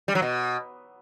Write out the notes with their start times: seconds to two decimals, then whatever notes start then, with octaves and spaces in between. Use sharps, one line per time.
0.08 G3
0.15 F#3
0.22 B2